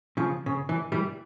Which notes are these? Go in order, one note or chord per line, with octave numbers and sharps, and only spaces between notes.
C#3 F3
C#3
E3
E3 G3